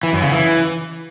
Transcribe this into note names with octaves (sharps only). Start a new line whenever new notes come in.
E3
F#2
C#3
E3